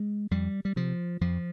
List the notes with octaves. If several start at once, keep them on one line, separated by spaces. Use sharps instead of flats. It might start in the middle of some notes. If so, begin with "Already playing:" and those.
Already playing: G#3
F2 G3
G3
C3 F3
F2 F3